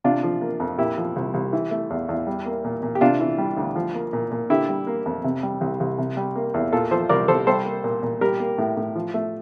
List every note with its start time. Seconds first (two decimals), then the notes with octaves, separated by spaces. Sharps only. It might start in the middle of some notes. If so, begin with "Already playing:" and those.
0.04 C3 D4 F4
0.23 F3
0.41 A#3
0.60 F2
0.78 A#2 E4 G4
0.97 F3
1.16 C2
1.34 C2
1.53 E3
1.71 A3
1.90 E2
2.09 E2
2.27 G3
2.46 A#3
2.64 A#2
2.83 A#2
2.95 G4
3.01 C3 D4 F4
3.20 E3
3.38 G3
3.57 D2
3.76 F3
3.94 A#3
4.13 A#2
4.31 A#2
4.50 D3 E4 G4
4.69 G3
4.87 A#3
5.06 F2
5.24 C3
5.43 G3
5.61 C2
5.80 C2
5.98 C3
6.17 G3
6.36 A#3
6.54 E2
6.72 A#2 F4 A4
6.91 F3 A4 C5
7.09 C2 A#4 D5
7.28 C2 A4 C5
7.47 G3 A4 C5
7.66 A#3
7.84 A#2
8.03 A#2
8.21 G3 G4 A#4
8.40 A#3
8.58 A2
8.77 A2
8.95 F3
9.14 A3